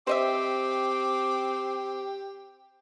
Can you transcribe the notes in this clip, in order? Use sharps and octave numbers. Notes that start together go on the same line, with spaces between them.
C4 G4 C5 D#5 E5 D6